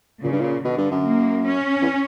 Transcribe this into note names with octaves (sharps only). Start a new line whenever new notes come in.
A#2 C#3
G2
A#2
B2 D3
G2
F#2
A#3
C#4
E2